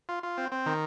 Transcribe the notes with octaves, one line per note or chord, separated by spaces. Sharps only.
F4
F4
C4
C4
D#3